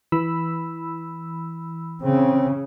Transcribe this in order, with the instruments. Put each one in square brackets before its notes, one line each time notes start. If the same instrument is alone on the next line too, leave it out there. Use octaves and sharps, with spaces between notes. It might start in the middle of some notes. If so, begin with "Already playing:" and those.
[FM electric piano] E3 B5 E6
[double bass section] C#3 [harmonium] C4